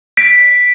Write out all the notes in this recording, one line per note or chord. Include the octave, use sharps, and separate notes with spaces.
B6 D7